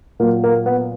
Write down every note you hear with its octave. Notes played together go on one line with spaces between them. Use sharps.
A#2 F#3 A#3
A#3
B3